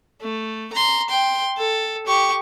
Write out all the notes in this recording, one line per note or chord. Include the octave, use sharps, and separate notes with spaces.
A3
A#5 C6
G5 C6
A4
G4 C#6